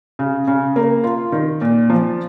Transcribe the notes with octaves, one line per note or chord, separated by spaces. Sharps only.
C#3
C#3
A#3
F4
D#3
A#2
F3